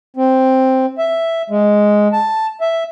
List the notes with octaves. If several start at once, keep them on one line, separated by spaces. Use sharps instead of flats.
C4
E5
G#3
A5
E5